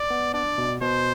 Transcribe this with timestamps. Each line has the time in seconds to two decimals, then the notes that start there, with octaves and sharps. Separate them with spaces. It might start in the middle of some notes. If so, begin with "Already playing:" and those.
Already playing: D5
0.10 B3
0.34 D4 D5
0.58 B2
0.81 B2 C5